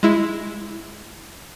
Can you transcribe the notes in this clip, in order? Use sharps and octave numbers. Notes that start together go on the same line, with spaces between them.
G#3 E4